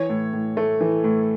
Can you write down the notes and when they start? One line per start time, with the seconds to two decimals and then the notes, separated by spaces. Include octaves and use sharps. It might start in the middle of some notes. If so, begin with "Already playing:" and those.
Already playing: E3 C#5
0.10 A2
0.33 A2
0.57 A3
0.81 E3
1.04 A2